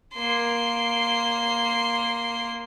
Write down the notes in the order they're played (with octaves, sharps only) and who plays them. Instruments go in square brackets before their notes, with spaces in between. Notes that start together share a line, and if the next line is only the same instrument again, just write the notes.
[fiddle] A#3 C6